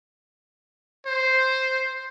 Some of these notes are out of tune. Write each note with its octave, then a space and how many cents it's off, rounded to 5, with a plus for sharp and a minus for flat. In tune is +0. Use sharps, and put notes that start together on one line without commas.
C5 +0